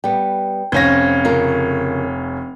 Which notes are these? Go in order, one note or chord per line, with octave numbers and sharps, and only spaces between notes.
G3 B3 G5
F1 C#4 C5 F5 G#6 A#6
C#3 F4 A#4